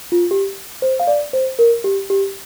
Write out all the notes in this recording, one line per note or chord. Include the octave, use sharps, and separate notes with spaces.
F4
G4
C5
F5
D5
C5
A#4
G4
G4